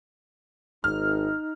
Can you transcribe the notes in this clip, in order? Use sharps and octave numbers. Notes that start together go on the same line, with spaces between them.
G#1 D#4 F6